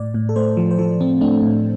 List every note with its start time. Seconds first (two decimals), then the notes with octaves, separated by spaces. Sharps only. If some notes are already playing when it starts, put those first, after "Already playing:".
Already playing: A2 D5
0.14 A2
0.29 A4
0.36 A3 C5
0.57 F3
0.71 C5
0.79 F3 A4
1.00 F3 C4
1.21 A3 D4
1.42 A2